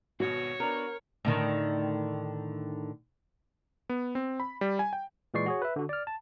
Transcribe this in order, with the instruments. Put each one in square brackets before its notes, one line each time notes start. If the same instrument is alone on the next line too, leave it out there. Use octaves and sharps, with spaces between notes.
[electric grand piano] G#1 B2 [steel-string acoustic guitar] F#4 [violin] C#5
[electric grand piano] B3 D4 [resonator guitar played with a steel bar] A#4
[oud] A2 D3 D#3
[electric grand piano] B3
C4
B5
G3
G#5
G5
[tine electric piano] A#2 E3 G#3 D5 C#6 C7
F#4 G#4 C#5
B4 E5
D3 F#4
D5 F6
A5